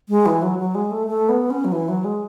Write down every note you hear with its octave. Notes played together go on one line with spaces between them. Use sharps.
G#3
E3
F#3
F#3
G#3
A3
A3
B3
C#4
F#3
E3
F#3
G#3